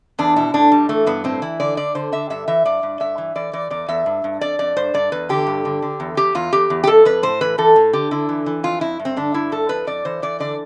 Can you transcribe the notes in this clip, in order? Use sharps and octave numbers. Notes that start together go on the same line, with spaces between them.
E2 D4
B2 E4
A2 D4
A2 G3
E3 A3
G2 B3
A2 C4
E3 E4
D3 D5
D3 D5
D3 C5
D3 E5
G2 E5
E3 E5
G2 D5
G2
G2 E5
E3
E3 D5
E3 D5
E2 D5
E2 E5
G2
G2
F2 D5
F2 D5
G2 C5
G2 D5
E2 B4
D3 G4
G2
D3
D3
E2
E2 G4
E2 F4
E2 G4
E2
G4
F2 A4
F2 B4
A2 C5
E3 B4
E3 A4
A2
D3 G4
D3 E4
E3
E3
F2 F4
F2 E4
G2
C4
D3 D4
G2 E4
G2 A4
F2 B4
F2 D5
E3 C5
E3 D5
D3 D5